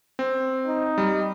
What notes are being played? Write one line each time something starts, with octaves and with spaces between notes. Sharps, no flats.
C4
D#4
G3